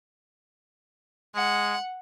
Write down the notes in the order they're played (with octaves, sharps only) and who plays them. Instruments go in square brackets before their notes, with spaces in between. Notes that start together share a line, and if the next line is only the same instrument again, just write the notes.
[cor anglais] G#3 [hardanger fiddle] F#5